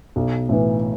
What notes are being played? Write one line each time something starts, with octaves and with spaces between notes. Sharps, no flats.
B1
A2 E3